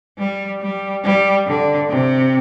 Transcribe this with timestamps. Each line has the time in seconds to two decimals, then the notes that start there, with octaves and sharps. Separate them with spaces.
0.18 G3
0.61 G3
1.04 G3
1.47 D3
1.90 C3